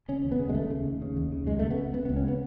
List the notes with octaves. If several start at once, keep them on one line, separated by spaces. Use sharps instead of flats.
C#3 C#4
D#2
B3
C#3
G#3
D#2 A3
C#3
D#2
C#3
D#2
C#3
C#2 G#3
C#3 A3
B3
C#2
C#3 B3
B3
C#2
C#4
C#3 B3